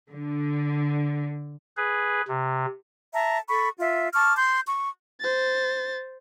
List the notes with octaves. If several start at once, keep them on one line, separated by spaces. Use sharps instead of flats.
D3
G#4 B4
C3
E5 A5 A#5
A4 B5 C#6
F4 E5
A5 C#6 D6 F6
C6 G6
C#6
C5 A6